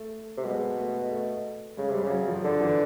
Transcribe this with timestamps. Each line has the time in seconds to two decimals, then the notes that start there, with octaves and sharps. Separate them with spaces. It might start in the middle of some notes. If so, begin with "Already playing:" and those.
Already playing: A3
0.37 C3
0.45 B2 G#3
0.78 A3
1.12 A3
1.77 C#3 G#3
1.90 C3 G3
2.03 C#3
2.11 F#3
2.28 F3
2.44 D3 F3
2.61 E3